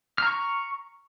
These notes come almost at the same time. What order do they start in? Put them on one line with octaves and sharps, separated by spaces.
F6 A#5 C#6